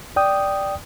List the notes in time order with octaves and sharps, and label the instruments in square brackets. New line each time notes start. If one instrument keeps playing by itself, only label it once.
[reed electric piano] D5 G5 D#6